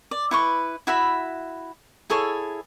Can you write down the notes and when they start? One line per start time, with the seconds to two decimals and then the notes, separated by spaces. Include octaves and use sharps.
0.11 D5
0.31 E4 B4 C#6
0.87 E4 F#4 E5 B5
2.10 E4 G#4 A4 C#5